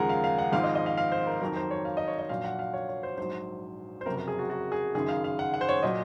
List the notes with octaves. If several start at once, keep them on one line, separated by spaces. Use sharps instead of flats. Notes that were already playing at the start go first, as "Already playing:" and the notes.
Already playing: D#2 C#3 F3 G#3 G#4 A#4 F#5
F5
F5
F#5
G#1 G#2 F3 G#3 F5
D#5
D#5
F5
F5
C5
A#4
F2 D#3 F#3 A#4
C5
C#5
F5
D#5
C#5
D#5
A#1 A#2 F#3 F5
F#5
F5
C#5
C#5
C5
A#1 G#2 F#3 C5
C5
F#1 F2 C3 F#3 A#4
A#4
G#4
F#4
F#4
G#4
F#1 F#2 D#3 G#4
F5
F5
F#5
F#5
C5
C#5
A#2 F#3 D#5